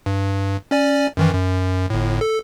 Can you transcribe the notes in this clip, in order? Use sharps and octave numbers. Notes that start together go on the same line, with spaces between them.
G2
C#4 D5 G#5
F#2 D#3 E3
F#2
G1 A2
A4